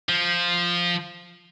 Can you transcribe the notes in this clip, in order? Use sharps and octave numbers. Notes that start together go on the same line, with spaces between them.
F3